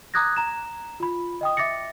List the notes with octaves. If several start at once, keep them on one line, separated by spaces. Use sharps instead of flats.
A#5 D6 D#6 F#6 G#6 A#6
A#5 E7
F4 B5
D#5 G5 D#6
E5 D6 A6 A#6 C#7